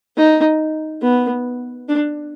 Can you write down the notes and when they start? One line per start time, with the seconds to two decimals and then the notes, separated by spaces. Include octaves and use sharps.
0.16 D#4
1.02 B3
1.89 D4